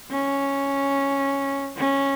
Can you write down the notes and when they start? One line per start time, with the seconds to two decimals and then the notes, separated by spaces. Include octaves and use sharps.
0.11 C#4
1.77 C#4